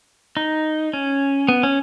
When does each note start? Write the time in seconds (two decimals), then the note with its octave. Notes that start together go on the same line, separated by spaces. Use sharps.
0.37 D#4
0.93 C#4
1.49 B3
1.63 C#4